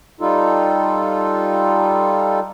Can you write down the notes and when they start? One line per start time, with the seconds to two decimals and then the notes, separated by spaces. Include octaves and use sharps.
0.21 G3 D#4 F4 A4